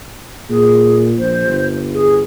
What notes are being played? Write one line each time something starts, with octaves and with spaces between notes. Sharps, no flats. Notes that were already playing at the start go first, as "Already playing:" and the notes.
A#2 G#4
A#1 C5
G1
G#4